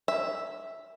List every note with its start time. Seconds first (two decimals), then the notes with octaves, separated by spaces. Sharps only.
0.08 E5